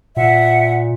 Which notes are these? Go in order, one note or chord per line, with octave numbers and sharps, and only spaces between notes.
A#2 E5 F#5